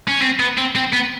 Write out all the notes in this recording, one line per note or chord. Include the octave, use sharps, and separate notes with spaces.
C#4
C4
B3
C4
C4
B3